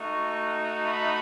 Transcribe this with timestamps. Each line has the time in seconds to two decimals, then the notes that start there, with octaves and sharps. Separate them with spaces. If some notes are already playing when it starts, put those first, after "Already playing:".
Already playing: A3 D#4 F#4 C#6
0.87 B5